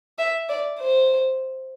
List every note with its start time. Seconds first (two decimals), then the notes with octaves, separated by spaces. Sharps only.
0.18 E5
0.49 D5
0.79 C5